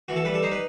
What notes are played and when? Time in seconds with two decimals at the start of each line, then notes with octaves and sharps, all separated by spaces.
0.08 E3 F#4
0.16 A4
0.25 G3 B4
0.34 A4
0.42 D#4 C5
0.51 B4